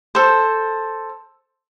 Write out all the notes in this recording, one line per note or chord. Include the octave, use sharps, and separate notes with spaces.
A4 C5